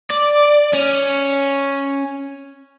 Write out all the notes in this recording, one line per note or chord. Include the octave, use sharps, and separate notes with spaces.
D5
C#4